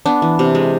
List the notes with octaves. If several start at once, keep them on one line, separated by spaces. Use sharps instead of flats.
B3 D4
E3
C3
G#3